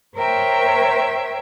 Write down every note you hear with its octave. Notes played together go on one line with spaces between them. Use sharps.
A#4 C5 C#5 E5 G5